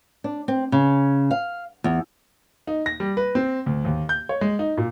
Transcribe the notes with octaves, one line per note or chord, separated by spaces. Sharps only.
D4
C4
C#3
F5
E2
D#4
A#6
G3
B4
C4
D2
D#2
G6
C#5
G#3
D#4
A#2